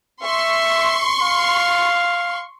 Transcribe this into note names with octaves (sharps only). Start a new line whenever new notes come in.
E5 C6 C#6
F5